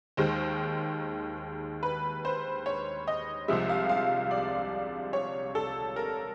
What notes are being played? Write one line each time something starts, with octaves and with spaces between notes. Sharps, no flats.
D#2 D#3 G#3 C5
B4
C5
C#5
D#5
C2 C3 F3 G#3 E5
F5
F5
D5
C#5
A4
A#4